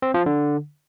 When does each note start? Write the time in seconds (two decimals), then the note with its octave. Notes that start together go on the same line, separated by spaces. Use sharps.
0.02 C4
0.14 F3
0.26 D3